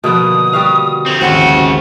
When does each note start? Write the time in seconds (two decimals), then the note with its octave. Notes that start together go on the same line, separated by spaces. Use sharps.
0.04 B2 D3 F3 A#3 B3 D#6
0.53 G3 F#4 F5
1.06 D3 C4
1.21 G#1 D#2 C#3 C4 F#4 C5 F#5